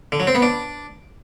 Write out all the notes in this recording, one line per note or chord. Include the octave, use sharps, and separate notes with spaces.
D3
F#3
C4
B3
D4